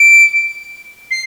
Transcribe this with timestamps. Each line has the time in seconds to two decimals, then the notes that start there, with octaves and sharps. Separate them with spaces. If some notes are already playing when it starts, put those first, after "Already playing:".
Already playing: D7
1.11 C7